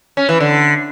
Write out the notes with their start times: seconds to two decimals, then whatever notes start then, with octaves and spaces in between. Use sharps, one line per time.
0.17 C#4
0.29 E3
0.40 D3